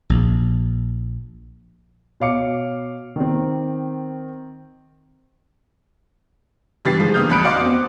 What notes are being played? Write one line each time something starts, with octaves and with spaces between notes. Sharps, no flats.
A#1
B2 C#5 F5 D6 C#7
D#3 C4
G2 E3 G4 A6 C7
G#2 F3 G#3
D3 E3 A#3 D#6 F6 G6
A1 F2 B5 F#6 C#7 D7
F#4 D5 D#5 F5 C6 D6
B3 C4